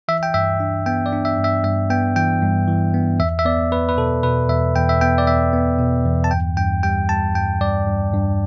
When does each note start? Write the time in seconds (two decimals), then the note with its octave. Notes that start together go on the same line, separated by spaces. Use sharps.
0.08 E3 E5
0.23 G5
0.34 G2 E5
0.60 D4
0.86 B3 G5
1.06 D5
1.12 D4
1.25 E5
1.38 G2
1.44 E5
1.64 G2 E5
1.90 B3 G5
2.16 E3 G5
2.42 G2
2.68 E3
2.94 B3
3.20 E2 E5
3.39 E5
3.45 B3 D5
3.72 B3 B4
3.89 B4
3.97 B2 A4
4.23 B2 B4
4.49 E2 E5
4.75 E2 G5
4.89 E5
5.01 B3 G5
5.18 D5
5.27 E2 E5
5.53 B3
5.79 B2
6.05 E2
6.24 A5
6.31 G2 G5
6.57 G2 G5
6.83 G3 G5
7.09 G3 A5
7.35 G2 G5
7.61 G2 D5
7.87 G2
8.13 G2